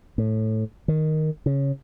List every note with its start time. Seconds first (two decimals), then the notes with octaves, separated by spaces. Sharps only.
0.18 A2
0.88 D#3
1.46 C#3